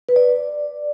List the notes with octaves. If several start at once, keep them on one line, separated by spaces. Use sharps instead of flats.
B4
D5